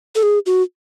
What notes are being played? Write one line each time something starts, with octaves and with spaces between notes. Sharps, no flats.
A4
G#4
F#4